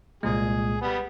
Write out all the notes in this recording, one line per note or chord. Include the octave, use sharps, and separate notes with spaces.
C2 A#2 G#3 G#4
G3 B3